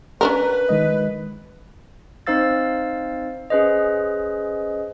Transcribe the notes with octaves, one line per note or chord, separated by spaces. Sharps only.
C#4 D4 A#4 B4 A#5
D#3 G#3 D#5
C4 D#4 C5 F5 E6 A6
C#4 G#4 B4 C5 D#5